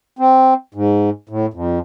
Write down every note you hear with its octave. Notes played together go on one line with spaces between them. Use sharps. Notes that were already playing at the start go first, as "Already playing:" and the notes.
C4
G#2
A2
F2